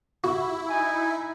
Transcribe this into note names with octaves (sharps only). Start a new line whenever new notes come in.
E4 F#4
D#4 G#5